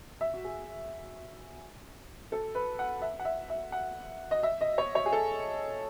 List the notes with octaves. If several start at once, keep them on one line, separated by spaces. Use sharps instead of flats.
E5
F#4
G#4
A4
B4
F#5
E5
F#5
E5
E5
F#5
D#5
E5
D#5
C#5
C#5
G#4
A4